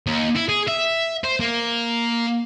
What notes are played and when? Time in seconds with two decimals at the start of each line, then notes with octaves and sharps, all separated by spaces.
0.07 D#2
0.36 E4
0.49 G#4
0.68 E5
1.24 C5
1.40 A#3